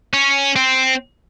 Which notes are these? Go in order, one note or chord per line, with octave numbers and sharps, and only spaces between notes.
C#4
C4